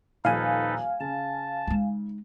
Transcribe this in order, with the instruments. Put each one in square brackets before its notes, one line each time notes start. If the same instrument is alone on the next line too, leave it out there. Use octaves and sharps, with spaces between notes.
[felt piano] D#1 F3 D#7 [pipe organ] D#4 A4 B4 [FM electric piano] F5 G#5
[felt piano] C#3 [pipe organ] A5
[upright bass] G#3 D#4